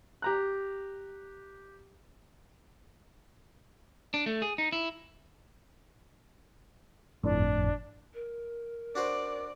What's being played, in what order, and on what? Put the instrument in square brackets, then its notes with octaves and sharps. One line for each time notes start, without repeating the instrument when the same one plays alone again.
[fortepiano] G4 A#5 F#6
[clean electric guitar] D4
A3
G#4
D#4
E4
[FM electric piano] G1 F2 A2 [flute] D4
[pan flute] A#4
[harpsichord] D4 F#4 C5 [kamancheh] D5